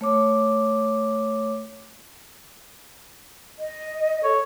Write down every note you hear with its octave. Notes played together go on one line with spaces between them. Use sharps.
A3 C#5 D6
D#5
A4 C#5